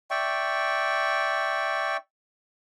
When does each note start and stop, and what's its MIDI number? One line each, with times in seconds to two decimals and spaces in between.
0.11 1.97 74
0.11 1.97 76
0.11 1.97 79
0.11 1.97 85